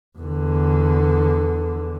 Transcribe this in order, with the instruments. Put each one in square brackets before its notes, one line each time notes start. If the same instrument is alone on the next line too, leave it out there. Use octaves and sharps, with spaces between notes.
[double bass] E2 D3